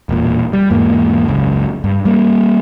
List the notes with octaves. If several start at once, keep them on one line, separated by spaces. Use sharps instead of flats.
E1 A#2
G3
E2 G#2 A#3
F#1 C#2
G2
G3 A#3